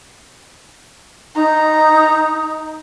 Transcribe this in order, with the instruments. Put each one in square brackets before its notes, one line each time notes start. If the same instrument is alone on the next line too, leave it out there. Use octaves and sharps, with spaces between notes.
[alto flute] D#4 [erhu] A#5